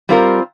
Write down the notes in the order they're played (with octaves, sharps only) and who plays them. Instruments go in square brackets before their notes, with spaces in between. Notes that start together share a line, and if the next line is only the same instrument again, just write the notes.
[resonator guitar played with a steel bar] G3 C4 F4 A#4